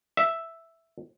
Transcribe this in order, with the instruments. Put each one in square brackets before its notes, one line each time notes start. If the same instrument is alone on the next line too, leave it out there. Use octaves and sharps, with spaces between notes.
[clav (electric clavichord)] E5